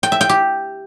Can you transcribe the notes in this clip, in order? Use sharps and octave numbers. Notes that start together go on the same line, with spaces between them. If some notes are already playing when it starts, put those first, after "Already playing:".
G5
E5
G5
G4